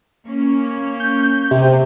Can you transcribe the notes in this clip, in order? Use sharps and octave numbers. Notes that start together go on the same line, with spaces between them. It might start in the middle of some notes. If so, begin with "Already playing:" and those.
A#3 C#4 C#5
G6
C3